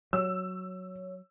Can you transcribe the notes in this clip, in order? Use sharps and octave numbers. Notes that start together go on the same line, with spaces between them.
F#3 C#5 E6